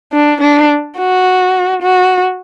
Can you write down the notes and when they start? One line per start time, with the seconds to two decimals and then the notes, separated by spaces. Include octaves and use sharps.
0.13 D4
0.41 D4
0.97 F#4
1.82 F#4